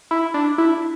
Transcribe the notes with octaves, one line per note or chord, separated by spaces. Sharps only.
E4
D4
E4